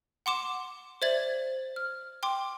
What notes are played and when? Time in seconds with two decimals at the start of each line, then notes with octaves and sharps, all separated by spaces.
0.26 F#5 C6 D6 E7
1.02 C5 D5 E5 G#6 A6 F#7
1.76 F6
2.23 G5 C6 D6